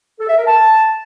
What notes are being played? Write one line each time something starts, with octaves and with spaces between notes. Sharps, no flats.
A4
E5
A#4
A5